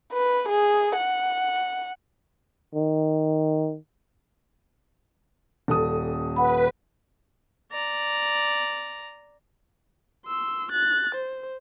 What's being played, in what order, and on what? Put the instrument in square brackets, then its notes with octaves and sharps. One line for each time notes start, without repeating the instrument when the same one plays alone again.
[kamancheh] B4
G#4
F#5
[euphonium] D#3
[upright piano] D#1 A4 D#6
[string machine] B4 [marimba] F#5 B5
[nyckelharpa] D5 A#5
[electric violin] C6 E6
F#6 A6
C5